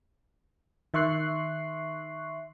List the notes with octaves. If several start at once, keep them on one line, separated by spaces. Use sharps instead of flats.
D#3 E5 C6 C#6 F#6 C7